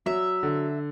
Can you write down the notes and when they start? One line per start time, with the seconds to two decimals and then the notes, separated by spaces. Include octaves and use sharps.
0.06 F#3 E5
0.43 D3